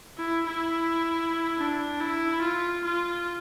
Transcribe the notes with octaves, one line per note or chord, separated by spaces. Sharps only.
E4
E4
D4
E4
F4
F4